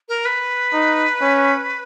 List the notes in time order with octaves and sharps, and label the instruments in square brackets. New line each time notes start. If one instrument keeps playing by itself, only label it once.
[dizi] A#4
B4
[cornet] D#4
C#4